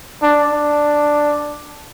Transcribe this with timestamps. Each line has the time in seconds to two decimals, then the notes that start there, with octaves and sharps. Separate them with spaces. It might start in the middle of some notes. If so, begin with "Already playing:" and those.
0.22 D4
0.53 D4